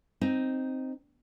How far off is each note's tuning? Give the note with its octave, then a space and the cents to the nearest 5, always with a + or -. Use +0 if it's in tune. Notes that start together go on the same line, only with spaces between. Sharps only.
C4 +0 D#4 +0